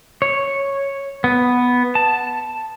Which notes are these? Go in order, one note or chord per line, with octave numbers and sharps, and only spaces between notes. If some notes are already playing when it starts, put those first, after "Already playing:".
C#5
B3
A5